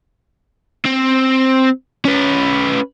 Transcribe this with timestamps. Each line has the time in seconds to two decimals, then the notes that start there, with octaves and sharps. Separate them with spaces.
0.86 C4
2.05 C#4 B4